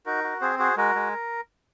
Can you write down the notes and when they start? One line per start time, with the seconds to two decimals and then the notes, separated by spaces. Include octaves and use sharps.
0.06 D#4 F#4 A#4
0.24 F#4
0.41 C4 G#4 C5
0.59 F#4 G#4 C5
0.77 G#3 F#4 A#4
0.95 G#3